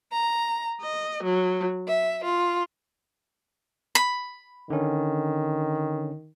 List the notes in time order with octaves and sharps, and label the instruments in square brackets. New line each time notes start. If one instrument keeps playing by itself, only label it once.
[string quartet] A#5
D#5
F#3
E5
F4
[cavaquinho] B5
[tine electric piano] D3 C#4 [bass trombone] D#3